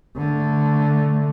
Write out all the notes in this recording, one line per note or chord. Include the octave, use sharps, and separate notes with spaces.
D3 A3